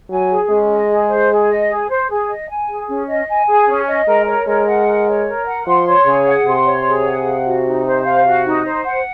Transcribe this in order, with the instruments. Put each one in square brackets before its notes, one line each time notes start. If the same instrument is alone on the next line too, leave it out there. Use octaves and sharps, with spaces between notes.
[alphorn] F#3 [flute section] G#5
[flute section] G#4
[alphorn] G#3 [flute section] C#4
[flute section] D#5
G#4
C5
G#4
D#5
G#4
C5
G#4
D#5
G#5
G#4
C#4
D#5
G#5
G#4
C#4
D#5
[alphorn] G#3 [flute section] A#4
[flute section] C#5
[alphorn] G#3 [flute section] A#4
[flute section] F#5
A#4
C#5
A#4
F#5
[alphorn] F3 [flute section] C6
[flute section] C#5
[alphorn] C#3 [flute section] G#4
[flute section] F#5
[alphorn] C3 [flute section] C6
[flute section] C#5
G#4
F#5
F5
F#4
D#4
C5
F5
F#4
D#4
C5
F#5